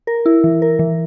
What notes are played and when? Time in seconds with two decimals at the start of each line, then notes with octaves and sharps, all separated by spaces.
0.07 A#4
0.26 E4
0.44 E3
0.62 A#4
0.79 E3